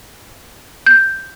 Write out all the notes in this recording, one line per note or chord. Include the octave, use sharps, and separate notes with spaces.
G6